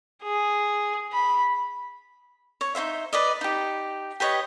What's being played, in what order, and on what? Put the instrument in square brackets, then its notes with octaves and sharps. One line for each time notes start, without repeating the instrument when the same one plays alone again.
[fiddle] G#4
B5
[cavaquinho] C#5
D#4 E4 C5 E5
B4 D5 D#5
D#4 G4
G4 B4 C#5 D#5